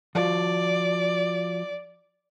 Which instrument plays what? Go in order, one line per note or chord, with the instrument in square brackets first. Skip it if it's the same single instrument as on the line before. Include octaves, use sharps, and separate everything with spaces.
[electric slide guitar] F3 F4 F#4 [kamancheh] D5